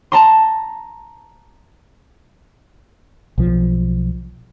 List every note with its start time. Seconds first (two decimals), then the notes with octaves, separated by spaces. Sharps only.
0.12 A5 A#5 C6
3.38 B1 F3